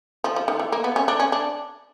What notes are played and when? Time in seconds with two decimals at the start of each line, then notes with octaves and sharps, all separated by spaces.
0.24 F3
0.36 F3
0.48 D#3
0.60 E3
0.72 A#3
0.84 B3
0.96 C#4
1.08 D4
1.20 C#4
1.32 D4